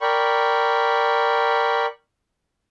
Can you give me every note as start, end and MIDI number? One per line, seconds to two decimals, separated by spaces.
0.01 1.86 70
0.01 1.86 74
0.01 1.86 79
0.01 1.86 83
0.01 1.86 85